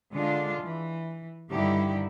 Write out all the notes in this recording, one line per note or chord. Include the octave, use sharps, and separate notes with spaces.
D3 G#3 D4 F4
E3
G2 D3 D#3 E4 G4